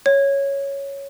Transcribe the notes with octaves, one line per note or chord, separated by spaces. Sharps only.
C#5